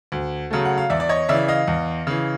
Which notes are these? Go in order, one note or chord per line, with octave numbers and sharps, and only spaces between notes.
D2
C#3 F#3 A3
F#5
F5
E2 D5 E5
D5
C#5 D#5
C#3 E3 D5 E5
D#5 F5
E2
C#3 E3